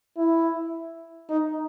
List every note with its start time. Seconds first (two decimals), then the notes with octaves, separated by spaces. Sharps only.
0.17 E4
1.30 D#4